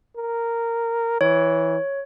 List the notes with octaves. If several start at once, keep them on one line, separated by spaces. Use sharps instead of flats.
A#4
E3 C#5